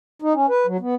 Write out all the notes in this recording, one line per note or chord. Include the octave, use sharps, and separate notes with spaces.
D#4
C#4
B4
F#3
B3